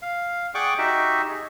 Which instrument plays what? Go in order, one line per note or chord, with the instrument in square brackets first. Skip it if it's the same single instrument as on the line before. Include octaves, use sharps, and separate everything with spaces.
[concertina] F5
G#4 D5 F#5 G5 C#6 D6
D#4 F#4 G4 E5
G#4